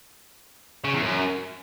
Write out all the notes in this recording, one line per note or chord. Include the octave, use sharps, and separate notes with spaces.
C#3
E2
F#2